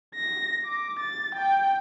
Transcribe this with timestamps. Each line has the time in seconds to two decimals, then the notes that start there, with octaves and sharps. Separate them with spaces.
0.15 A#6
0.65 D6
1.00 A6
1.35 G5